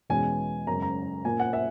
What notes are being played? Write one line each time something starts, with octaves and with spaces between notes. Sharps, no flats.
E2 B2 G#3 C#4 G#5
F#2 C#3 G#3 A#5
A#5
A#2 A#3 C#4 G#5
F#5
E5